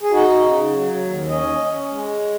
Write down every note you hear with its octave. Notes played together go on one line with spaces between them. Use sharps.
G#4
D#4 F#4
C#3
F#3
D#2
C#4 D#5
C#4
G#3